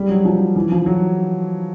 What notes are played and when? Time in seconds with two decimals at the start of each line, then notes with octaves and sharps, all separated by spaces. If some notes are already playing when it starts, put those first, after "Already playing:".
Already playing: G3
0.09 F#3
0.25 F3
0.56 E3
0.71 F3
0.86 F#3